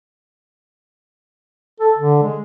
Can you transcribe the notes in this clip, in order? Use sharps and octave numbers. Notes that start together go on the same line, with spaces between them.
A4
D3
G#3